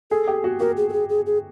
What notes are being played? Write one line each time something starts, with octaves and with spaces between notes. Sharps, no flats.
G#4 A4
G4
F#4
F#4 A#4
G#4
A4
G#4
G#4
G#4